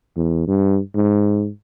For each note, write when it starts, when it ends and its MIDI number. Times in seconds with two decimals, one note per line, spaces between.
0.17 0.46 40
0.48 0.79 43
0.95 1.50 44